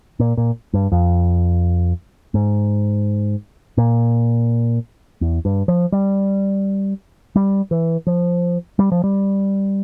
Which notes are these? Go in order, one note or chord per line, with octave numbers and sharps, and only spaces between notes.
A#2
A#2
G2
F2
G#2
A#2
E2
G2
F3
G3
G3
E3
F3
G3
F3
G3